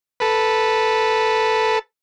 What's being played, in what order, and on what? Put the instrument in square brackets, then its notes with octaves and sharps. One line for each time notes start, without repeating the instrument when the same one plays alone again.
[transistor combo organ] A4 B4